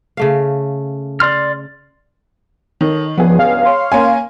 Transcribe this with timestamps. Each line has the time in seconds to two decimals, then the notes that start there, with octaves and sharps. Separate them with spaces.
0.17 C#3 A3 F5
1.20 D5 C6 F6
2.81 D#3 A4 C#5 D#5
3.18 C#2 G2 F3 B3 G#4
3.39 F5
3.65 C#5 C6
3.92 A#3 C#4 G#5